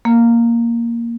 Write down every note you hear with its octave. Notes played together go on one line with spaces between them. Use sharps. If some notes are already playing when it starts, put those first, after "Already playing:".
A#3